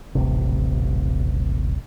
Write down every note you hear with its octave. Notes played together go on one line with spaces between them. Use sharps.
D#1 A1 C3